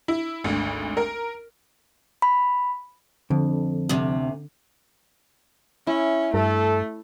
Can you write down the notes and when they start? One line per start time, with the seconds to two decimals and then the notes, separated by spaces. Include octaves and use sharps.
0.08 E4
0.44 G#1 D2
0.97 A#4
2.22 B5
3.30 F2 D3
3.89 D2 C3
5.87 C#4 E4
6.34 G2 A3 A4